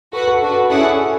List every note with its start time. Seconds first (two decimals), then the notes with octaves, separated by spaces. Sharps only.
0.13 F#4 A4 B4 F#5
0.28 A4
0.41 D4 F#4 B4
0.70 C#4 E4 G#4 A4 D5 F#5